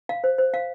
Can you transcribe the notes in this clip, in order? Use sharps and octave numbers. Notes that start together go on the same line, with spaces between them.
F5
C5
C5
F5